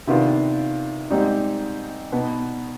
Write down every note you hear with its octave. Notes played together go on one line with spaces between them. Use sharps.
C3 D#3 B3 D4 F4
G#2 G3 C4 D#4
B2 B3 D#4